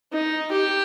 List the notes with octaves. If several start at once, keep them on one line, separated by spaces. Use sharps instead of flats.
D#4
G4